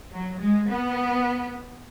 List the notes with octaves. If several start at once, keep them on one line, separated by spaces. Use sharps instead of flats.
F#3
G#3
B3